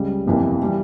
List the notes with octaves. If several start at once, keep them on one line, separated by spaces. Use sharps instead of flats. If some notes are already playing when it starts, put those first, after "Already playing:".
Already playing: C#2 C#3 G3
G1 F2 C3 E3 A#3
E3 G3